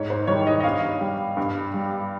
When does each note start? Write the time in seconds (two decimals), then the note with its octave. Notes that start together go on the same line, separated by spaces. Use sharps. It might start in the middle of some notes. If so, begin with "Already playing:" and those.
Already playing: G#2 C#5
0.10 C5
0.27 D#3 G3 C#5
0.47 D#5
0.60 D#5
0.64 G2 F5
1.00 G3
1.37 G2
1.74 G3